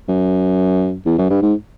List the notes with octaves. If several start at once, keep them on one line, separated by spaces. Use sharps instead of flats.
F#2
E2
F#2
G2
G#2